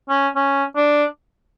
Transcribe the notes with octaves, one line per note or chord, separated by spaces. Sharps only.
C#4
C#4
D4